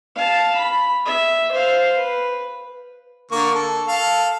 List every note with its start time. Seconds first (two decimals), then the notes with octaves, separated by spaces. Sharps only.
0.15 F5 A5
0.55 B5
1.05 E5
1.51 C5 F5
1.97 B4
3.31 D3 A#3 C#6
3.55 A4
3.88 A4 F5